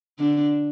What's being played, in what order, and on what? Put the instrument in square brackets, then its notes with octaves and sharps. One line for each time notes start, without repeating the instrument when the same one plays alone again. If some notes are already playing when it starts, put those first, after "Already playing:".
[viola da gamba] D3 D4